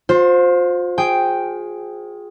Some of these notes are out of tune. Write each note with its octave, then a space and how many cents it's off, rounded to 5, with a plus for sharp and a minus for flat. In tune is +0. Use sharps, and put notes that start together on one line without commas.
F4 +35 C5 +0
G#4 +0 G5 +0